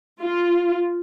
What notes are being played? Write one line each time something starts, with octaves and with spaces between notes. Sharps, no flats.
F4